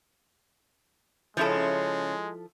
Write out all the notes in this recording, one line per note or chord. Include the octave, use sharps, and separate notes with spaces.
C#3 F3 G#3 E4 A4 C#5